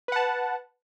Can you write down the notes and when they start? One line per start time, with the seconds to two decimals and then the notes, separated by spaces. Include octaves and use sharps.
0.08 B4
0.12 F#5
0.16 A5